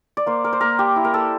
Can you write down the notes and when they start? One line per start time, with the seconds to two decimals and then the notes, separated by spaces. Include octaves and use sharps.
0.17 D5
0.26 A#3 C5
0.44 A#4
0.53 C5
0.61 A#3 A#4
0.79 G4
0.96 E4
1.04 A#4
1.14 A4